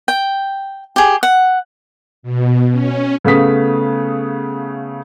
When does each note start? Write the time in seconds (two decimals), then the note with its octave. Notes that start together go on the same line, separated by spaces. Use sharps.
0.08 G5
0.96 G4 G#4
1.23 F#5
2.23 B2
2.72 C#4
3.24 C#3 A3 B3 F5 D#6 B6